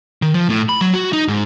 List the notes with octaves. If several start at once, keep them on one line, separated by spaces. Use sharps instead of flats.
D#3
F3
A2
B5
F#3
F#4
D#4
G#2